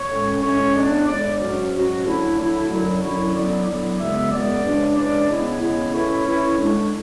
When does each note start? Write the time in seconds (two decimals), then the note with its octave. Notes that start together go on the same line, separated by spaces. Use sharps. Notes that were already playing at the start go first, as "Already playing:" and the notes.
Already playing: C#5
0.10 A2 G#3 C#4
0.42 A2 G#3 C#4 C#5
0.75 A2 G#3 B3 D4 D5
1.07 A2 G#3 B3 D4 D5
1.40 G#2 F#3 C#4 F#4
1.72 G#2 F#3 C#4 F#4
2.04 D3 F#3 A3 E4
2.37 D3 F#3 A3 E4
2.69 F#2 D3 F#3 C#4 E4
3.01 F#2 D3 F#3 C#4 E4 C#5
3.34 D3 F#3 B3 E4 D5
3.66 D3 F#3 B3 E4 D5
3.99 F#2 C#3 G#3 B3 E5
4.31 F#2 C#3 G#3 B3 D5
4.63 C#3 E3 G#3 D4
4.96 C#3 E3 G#3 D4 D5
5.29 C#3 G#3 B3 E4
5.60 C#3 G#3 B3 E4
5.93 E3 A3 C#4 E4 C#5
6.25 E3 A3 C#4 E4
6.59 D3 G#3 D4